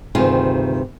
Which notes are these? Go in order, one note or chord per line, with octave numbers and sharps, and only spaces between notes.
D2 G2 C3 D#3 F4 G#4